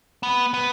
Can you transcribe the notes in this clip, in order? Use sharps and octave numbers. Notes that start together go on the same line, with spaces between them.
B3
B3